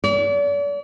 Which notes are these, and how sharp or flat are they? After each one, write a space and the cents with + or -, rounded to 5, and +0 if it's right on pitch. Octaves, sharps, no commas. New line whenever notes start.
D5 -40